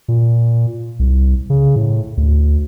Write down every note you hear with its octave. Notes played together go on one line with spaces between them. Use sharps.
A#2
C2
C#3
A2
D2